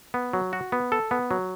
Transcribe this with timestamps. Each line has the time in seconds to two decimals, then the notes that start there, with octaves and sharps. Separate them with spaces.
0.14 B3
0.33 F#3
0.53 F#4
0.72 B3
0.92 A4
1.11 B3
1.31 F#3